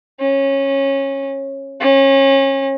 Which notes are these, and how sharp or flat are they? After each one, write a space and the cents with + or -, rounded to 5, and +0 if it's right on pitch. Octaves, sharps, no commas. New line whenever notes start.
C#4 -20
C#4 -30